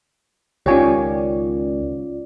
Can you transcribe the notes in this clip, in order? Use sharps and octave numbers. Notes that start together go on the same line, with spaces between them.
C#2 D#3 C#4 F4 G4 C#5 D5 G#5